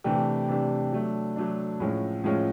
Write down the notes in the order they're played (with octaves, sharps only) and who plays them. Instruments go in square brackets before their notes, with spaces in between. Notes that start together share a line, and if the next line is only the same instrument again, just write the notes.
[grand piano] C3 E3 A3 D4 G4
C3 E3 A3 D4 G4
F#3 A3 D4
F#3 A3 D4
A2 F3 G#3 C#4
A2 F3 G#3 C#4